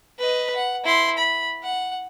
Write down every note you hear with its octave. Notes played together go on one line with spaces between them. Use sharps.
B4 D#5
F#5
E4 C6
B5
F#5